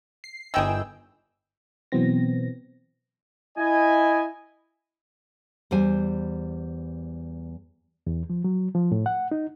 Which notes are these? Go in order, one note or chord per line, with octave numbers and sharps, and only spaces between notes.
C7
G1 D#3 E3 G#4 G5 E6
B2 E3 F#3 B3 C4 A#6
E4 D#5 G#5
E2 G3 C5 G#5
E2
F3
F#3
F3
A2
F#5
D#4